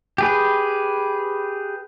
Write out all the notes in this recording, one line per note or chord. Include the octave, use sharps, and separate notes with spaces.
G4 G#4 B4